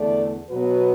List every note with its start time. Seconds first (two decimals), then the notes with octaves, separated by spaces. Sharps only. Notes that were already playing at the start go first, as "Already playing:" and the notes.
Already playing: E2 D3 A3 A4 D5
0.50 B2 F#3 B3 F#4 B4